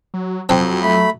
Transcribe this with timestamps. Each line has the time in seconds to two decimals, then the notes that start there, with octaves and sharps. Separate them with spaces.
0.14 F#3
0.49 F2 F#3 C4 G5 A5
0.82 A3 B5